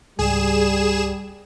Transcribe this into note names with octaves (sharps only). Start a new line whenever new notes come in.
C#2 G#2 G3 G#4 E7